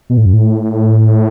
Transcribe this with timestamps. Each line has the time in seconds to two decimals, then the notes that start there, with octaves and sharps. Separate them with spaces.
0.10 B2
0.17 A2
0.26 F#2
0.33 A2